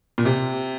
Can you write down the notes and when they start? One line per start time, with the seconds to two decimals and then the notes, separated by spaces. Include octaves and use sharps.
0.18 A#2
0.25 C3